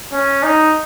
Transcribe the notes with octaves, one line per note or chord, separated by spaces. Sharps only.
C#4
D#4